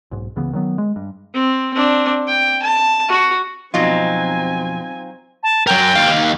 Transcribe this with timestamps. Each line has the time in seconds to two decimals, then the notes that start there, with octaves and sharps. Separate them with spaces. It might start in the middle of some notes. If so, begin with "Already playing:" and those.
0.11 B1 G#2
0.36 C#2 C#3 E3 B3
0.53 D#3 F#3 B3
0.78 G#3
0.96 G2
1.34 C4
1.74 C4 D4
2.27 G5
2.62 A5
3.09 F#4
3.74 F2 B2 F#3 C4 D#4 F4 G#5
5.43 A5
5.67 F#3 A#4 G5
5.96 D#2 F5